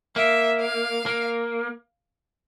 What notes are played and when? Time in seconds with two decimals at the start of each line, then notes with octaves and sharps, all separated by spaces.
0.16 A#3 E5
0.61 F5
1.06 A#3